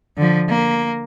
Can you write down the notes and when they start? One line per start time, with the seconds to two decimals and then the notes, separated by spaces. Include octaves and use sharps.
0.17 D3 F3
0.49 A#3